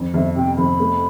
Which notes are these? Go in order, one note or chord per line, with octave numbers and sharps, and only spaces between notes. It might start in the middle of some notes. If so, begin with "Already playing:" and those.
Already playing: F2
F2 E5
C3 G5
F2 B5
A3